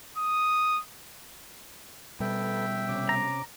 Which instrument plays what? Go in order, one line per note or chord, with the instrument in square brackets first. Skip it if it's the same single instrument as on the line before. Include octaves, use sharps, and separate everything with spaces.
[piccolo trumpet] D#6
[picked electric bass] B2 G3 [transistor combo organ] A4 B4 [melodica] E5 G5
[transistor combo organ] C3 C#4 D6
[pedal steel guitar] A#5